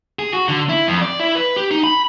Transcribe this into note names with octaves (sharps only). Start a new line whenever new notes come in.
G#4
F#4
D3
E4
F2
D5
E4
B4
G4
D#4
B5